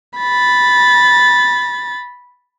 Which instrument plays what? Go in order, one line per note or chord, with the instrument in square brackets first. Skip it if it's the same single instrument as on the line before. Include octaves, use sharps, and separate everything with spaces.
[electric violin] B5 A6